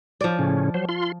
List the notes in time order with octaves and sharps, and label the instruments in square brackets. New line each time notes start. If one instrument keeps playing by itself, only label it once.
[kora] F3 D5
[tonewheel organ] A2 C#3 C#4
F#3 C5
F4 C6